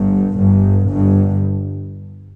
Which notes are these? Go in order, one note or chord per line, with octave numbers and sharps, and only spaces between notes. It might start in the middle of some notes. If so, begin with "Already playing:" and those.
Already playing: G1 G2
G1 G2
G1 G2